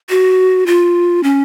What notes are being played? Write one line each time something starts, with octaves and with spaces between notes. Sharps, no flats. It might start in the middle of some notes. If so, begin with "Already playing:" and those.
F#4
F4
C#4